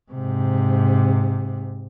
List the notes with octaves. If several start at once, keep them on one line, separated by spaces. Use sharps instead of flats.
G#2 C3